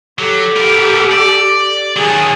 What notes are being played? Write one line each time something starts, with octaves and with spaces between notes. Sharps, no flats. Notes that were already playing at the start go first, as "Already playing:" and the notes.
F#3 G4 A4
B3 A#4
D5
D#3 F#3 G#4 A5